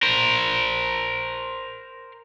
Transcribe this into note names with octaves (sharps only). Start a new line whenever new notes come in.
A#4 C5